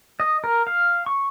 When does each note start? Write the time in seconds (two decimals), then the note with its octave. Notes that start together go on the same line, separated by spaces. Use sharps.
0.20 D#5
0.44 A#4
0.67 F5
1.06 C#6